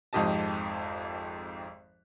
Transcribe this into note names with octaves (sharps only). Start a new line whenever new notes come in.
G#1 F2 G#2 G4 D#5 A5